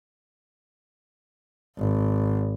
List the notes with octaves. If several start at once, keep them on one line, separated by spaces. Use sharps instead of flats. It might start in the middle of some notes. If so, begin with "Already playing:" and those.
G#1